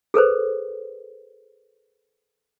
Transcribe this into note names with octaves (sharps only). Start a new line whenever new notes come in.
G#4 A4 B4 C5